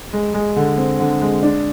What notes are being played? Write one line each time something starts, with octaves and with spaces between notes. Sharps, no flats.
G#3
G#3
D3
C4
D3
G#3
D4